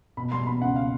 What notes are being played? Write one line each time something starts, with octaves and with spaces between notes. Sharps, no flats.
B2 B5
G3 C6
B3 B5
C#2 F#5
F5